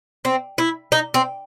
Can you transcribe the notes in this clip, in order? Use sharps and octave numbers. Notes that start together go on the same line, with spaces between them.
C4
E4
D#4
C4